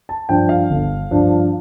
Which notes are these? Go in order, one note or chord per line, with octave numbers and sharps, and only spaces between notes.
A5
G2 F3 D4 G5
F5
G1
G2 F3 D4